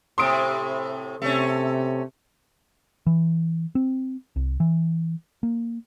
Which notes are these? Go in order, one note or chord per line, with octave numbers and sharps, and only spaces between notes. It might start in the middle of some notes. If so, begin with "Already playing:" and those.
A2 C3 C6 D#6 D7
C3 A3 C#4
E3
C4
C2
E3
A#3